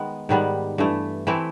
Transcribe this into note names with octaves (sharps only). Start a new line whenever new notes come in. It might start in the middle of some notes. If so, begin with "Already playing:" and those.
Already playing: D#3 G#3 B3
G#2 D#3 G3 B3
G2 E3 A3
E3 A3 C4 E4